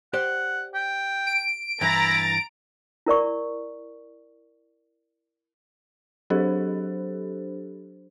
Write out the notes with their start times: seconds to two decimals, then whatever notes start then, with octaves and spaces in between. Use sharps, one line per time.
0.13 G4 C5 D5 F#5
0.74 G5
1.27 D7
1.81 G2 E3 E4 A#5 A6
3.07 E4 A#4 D5 C#6
6.30 F#3 D4 G4 A4 C5